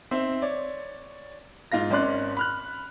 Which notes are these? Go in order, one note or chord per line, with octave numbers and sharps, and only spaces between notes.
C4 D#4 C5 E5
C#5 D5
G#2 F4 F5 A#6
G#1 C#4 D5 C6 F#6
B5 F6 F#6